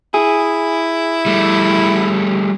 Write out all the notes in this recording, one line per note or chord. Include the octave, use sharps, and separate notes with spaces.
E4 G#4
G3 A3